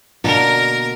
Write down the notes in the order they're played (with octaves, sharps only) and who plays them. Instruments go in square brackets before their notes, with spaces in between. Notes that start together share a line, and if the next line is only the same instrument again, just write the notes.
[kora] B2 D3 A#3 [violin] A#4